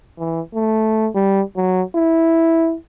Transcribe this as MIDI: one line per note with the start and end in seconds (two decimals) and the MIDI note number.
0.19 0.41 52
0.55 1.09 57
1.15 1.42 55
1.57 1.82 54
1.96 2.76 64